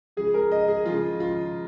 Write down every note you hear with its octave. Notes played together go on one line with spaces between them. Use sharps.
C#3 F3 G#3 G#4
A#4
D#5
G#4
C#3 F3 G#3 F4
F4